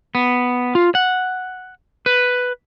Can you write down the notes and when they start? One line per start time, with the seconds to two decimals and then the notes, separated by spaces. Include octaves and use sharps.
0.15 B3
0.75 F4
0.95 F#5
2.06 B4